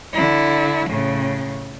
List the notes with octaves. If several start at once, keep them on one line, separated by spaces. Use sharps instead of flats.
D3 E4
A2 C#3